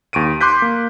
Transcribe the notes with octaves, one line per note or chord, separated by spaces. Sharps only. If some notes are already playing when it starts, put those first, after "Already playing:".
D#2 C#6 D7 D#7
C6 D6 F#6 G6 B6
A#3